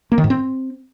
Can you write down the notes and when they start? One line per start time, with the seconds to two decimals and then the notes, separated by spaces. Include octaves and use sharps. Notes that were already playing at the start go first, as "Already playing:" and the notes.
0.12 A#3
0.18 D#3
0.24 G#2
0.30 C4